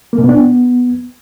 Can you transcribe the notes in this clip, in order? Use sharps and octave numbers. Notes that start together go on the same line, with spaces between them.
A#3
B2
B3
D4
B3